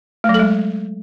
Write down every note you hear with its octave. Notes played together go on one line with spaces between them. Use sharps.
A3
F#3
A4
G#3